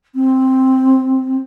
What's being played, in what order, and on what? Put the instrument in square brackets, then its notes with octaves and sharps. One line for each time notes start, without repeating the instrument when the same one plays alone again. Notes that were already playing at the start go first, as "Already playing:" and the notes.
[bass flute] C4